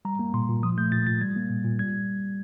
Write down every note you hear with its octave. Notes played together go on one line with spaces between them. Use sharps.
G3 A#5
A#3
A#2 C6
A#2
F3 D#6
A3 G6
A#2 A6
A#2 A6
G3 G#6
A#3
A#2
A#2
G3 G#6